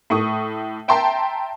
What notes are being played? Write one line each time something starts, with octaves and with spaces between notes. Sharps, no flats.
A2 C#6 D#6
E5 G5 A5 A#5 C6